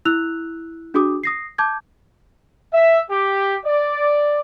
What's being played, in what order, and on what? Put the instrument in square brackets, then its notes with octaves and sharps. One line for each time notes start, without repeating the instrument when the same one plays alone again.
[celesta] E4 E6 F#6 F7
D4 F#4 G#4 D6 D#6
D#6 A#6 C7
A5 D6 G6 G#6
[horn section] E5
G4
D5